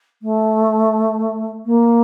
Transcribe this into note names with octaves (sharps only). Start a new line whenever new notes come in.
A3
A#3